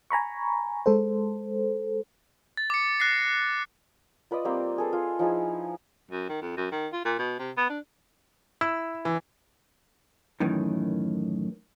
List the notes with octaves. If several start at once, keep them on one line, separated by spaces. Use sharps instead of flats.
G#5 A#5 B5 C#6
G#3 A4 C5
A6
D6 C#7
F#6 A#6 C7
F4 B4 D5 D#5
G3 A#3 C4 A#4
G#4 A4 B4
F4
F3 D#4 E4 G#4
F#2
D#3
F2
F#2
D#3
F4
A#2
B2
C3
B3
D4
E4 E6
E3
F#2 A2 D#3 E3